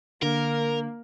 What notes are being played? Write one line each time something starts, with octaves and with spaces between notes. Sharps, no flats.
D3 A#3 A#4